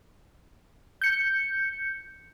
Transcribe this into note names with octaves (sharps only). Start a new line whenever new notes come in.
G6 C#7